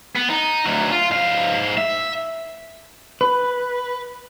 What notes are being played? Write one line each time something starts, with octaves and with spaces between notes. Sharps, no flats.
B3
D#4
D2 F#3
F4
G#2 F5
E5
B4